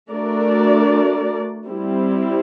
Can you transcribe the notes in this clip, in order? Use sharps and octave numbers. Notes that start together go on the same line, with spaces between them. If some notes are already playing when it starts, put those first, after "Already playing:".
A3 D4 F#4 A#4 D5
G3 C4 E4 G4